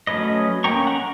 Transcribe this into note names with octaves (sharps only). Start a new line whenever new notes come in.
F#3 A3 C#4 B4 D#5
A#3 C#4 G5 A#5 C#6
F#5 A#5